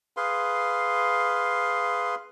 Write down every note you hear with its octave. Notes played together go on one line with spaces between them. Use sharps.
G#4 B4 F5 C6